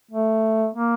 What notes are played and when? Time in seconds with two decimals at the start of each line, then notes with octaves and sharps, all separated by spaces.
0.11 A3
0.75 A#3